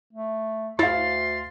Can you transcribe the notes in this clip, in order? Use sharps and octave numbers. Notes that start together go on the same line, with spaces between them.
A3
D2 E4 C#5 F5 C6 A6